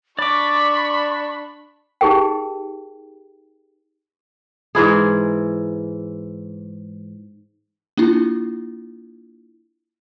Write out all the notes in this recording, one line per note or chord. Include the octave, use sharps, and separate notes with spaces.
D4 D5 B5 C#6 D6
D#4 G4 G#4 A#4 G5
G#2 E3 E4 G#4
A#3 D4 E4 F4